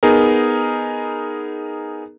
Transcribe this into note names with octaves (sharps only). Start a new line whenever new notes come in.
B3 D#4 G#4 A#4